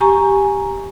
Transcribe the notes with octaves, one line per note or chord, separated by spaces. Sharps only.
G4 G#5 A#5 C#6